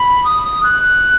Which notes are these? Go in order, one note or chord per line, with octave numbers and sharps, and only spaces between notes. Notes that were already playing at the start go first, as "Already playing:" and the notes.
Already playing: B5
D#6
D#6
F#6